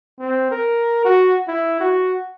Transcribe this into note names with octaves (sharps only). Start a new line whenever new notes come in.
C4
A#4
F#4
E4
F#4